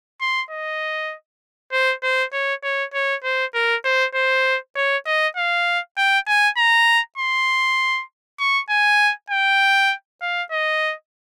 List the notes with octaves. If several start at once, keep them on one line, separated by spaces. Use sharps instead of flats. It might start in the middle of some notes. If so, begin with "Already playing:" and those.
C6
D#5
C5
C5
C#5
C#5
C#5
C5
A#4
C5
C5
C#5
D#5
F5
G5
G#5
A#5
C6
C#6
G#5
G5
F5
D#5